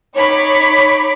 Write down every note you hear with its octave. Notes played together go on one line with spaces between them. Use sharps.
D#4 C#5 B5 D6 B6